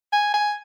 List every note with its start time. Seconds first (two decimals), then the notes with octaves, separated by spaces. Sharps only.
0.13 G#5
0.34 G#5